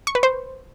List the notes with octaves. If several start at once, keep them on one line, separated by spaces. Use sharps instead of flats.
C#6
B4
C5